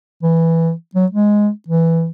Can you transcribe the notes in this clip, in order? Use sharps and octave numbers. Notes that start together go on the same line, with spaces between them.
E3
F#3
G#3
E3